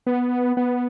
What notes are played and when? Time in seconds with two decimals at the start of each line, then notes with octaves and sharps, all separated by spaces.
0.07 B3
0.57 B3